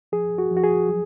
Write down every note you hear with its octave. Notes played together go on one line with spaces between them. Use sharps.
F3 G#4
F#4
F3
F#4
G#4
F#3